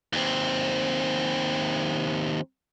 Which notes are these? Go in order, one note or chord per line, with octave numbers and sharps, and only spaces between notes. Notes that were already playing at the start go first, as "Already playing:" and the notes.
D#2 C4